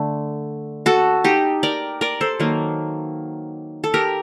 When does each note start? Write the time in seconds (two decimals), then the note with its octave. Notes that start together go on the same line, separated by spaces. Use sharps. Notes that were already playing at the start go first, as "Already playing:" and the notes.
Already playing: D3 A3
0.86 F#4 A4
1.24 D#4 G4
1.63 A#4 D5
2.01 A#4 D5
2.21 A4 C5
2.40 D#3 F#3 A#3
3.84 A4
3.94 G4 A#4